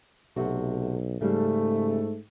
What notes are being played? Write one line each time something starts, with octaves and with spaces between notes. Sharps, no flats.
B1 C3 A3 F#4
G#2 C#3 G3 A3